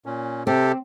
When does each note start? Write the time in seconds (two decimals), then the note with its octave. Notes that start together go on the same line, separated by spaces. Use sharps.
0.06 A#2 C#4
0.47 C3 C4 G4 A4